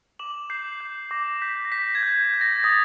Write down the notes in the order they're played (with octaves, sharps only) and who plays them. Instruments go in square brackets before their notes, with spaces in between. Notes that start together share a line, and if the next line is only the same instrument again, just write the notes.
[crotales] D6 E7 F#7
G6 C7
G6
D6 A#6
G6 B6
A#6
G6 B6
G#6
G6
G6
A#6
D#6 A6